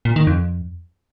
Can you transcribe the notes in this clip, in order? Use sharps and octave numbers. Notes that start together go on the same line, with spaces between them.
A#2
D#3
F2